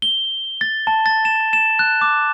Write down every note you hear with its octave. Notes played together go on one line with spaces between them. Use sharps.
G7
A6
A5
A6
E7
E7
F#6
D6